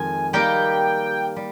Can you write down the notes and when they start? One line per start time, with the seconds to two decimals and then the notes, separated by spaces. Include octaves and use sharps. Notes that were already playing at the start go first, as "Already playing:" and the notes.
Already playing: F2 D#3 G#3 G#5
0.33 G3 A#3 D#4 G4 G5
1.36 G3